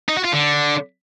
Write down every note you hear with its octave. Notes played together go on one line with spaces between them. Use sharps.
D#4
F#4
F4
D3